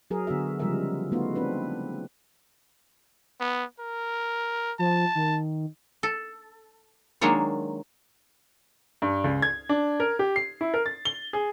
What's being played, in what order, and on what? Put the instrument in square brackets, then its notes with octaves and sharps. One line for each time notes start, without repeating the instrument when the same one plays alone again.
[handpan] F#3 G#4 A#4
D3 B3 F#4 E5
C#3 F3 G3 G#3 A#4 E5
A3 B3 D#4 F4 F#4
C4 D4 B4
[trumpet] B3
A#4
[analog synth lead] F3 [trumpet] A5
[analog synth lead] D#3
[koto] A4
D#3 F#3 G#3 A#3 D4 C#5
[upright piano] G2
C#2
G#6
D4
A#4
G4
C7
E4
A#4
A6
G7
G#4